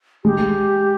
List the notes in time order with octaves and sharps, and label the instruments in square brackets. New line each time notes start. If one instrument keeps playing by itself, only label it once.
[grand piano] G#3 [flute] G4